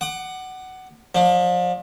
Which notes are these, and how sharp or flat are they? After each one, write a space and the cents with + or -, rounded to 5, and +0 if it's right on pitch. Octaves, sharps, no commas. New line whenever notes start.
F#5 +15 D6 +30
F3 +35 D4 +20